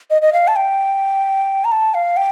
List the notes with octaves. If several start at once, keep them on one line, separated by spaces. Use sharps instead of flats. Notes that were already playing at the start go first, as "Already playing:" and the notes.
D#5
D#5
F5
A5
G5
A#5
A5
F5
G5